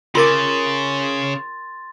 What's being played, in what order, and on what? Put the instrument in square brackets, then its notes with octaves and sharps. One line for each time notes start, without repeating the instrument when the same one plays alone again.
[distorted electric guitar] C#3 [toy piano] F4 A#4 D6 [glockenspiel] C6 A6